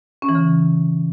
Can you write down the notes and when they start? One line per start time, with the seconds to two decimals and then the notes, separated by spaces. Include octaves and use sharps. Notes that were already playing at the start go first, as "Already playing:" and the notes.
0.22 C#4
0.29 E3
0.35 C#3